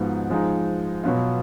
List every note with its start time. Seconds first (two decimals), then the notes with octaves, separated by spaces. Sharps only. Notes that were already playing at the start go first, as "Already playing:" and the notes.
Already playing: G#2 F3 B3 D#4 F#4
0.30 F3 G#3 D#4
1.04 B2 F#3 B3 F4